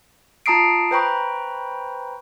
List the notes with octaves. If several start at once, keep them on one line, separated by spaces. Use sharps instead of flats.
F4 A5 A#5 D#6 C7 D7
B4 C5 G5 A#5 B5 C#6